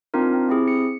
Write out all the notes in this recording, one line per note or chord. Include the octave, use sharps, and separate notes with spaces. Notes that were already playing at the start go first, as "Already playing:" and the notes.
C4 D4 D#4 F4 A#4
C4
C4 E4 G4 G#4
C#7